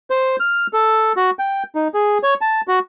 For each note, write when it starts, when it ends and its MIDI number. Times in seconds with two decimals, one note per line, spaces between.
0.10 0.36 72
0.40 0.67 89
0.73 1.13 69
1.16 1.31 66
1.39 1.63 79
1.75 1.88 63
1.94 2.18 68
2.23 2.34 73
2.41 2.61 81
2.68 2.79 66